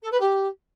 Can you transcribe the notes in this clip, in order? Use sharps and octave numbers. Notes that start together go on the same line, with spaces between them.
A4
B4
G4